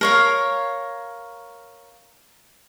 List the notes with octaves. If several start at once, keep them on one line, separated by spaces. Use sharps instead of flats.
A#4 C#5 F5